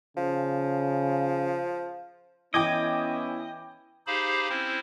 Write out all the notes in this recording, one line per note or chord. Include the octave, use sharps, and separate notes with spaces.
C#3 F3
E3 B3 C#4 E4 D#5 G5 D6 G#6
D#4 G4 G#4 C5 F5 B5
C4 C#4 E4 C5